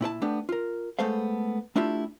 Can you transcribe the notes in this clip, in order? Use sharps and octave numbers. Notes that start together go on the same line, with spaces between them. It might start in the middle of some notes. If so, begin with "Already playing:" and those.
A#2 E4 A#4 A5
A3 B3 D4 G4
F4 A#4
G#3 A3 B3 A4 C5 F5
A3 D4 E4 F4 G4 E5